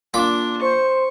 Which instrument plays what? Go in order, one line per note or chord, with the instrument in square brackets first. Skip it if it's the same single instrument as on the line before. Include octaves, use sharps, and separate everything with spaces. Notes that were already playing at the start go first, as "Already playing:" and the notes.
[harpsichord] A#2 B5 D6 [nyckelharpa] D4
[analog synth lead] C5 [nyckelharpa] C#6